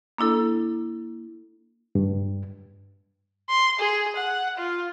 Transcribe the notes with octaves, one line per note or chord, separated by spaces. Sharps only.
A#3 D4 E4 A4
G2
C6
G#4
F#5
F4